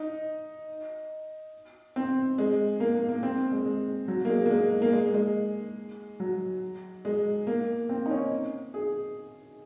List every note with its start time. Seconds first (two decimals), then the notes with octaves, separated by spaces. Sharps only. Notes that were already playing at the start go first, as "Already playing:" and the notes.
Already playing: D#4
1.96 C4
2.38 G#3
2.80 A#3
2.95 A#3
3.09 A#3
3.23 C4
3.51 G#3
3.65 G#3
4.08 F#3
4.25 A#3
4.29 G#3
4.46 A#3
4.50 G#3
4.82 A#3
4.92 G#3
5.14 G#3
6.20 F#3
7.05 G#3
7.47 A#3
7.89 C4
8.06 D#4
8.11 C#4
8.74 G#4